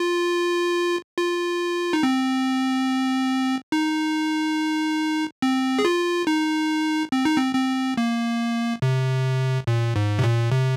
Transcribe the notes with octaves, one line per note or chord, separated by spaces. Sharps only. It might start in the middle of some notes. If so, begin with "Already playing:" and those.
Already playing: F4
F4
D#4
C4
D#4
C4
G#4
F4
D#4
C4
D#4
C4
C4
A#3
C3
A#2
G#2
C3
A#2
C3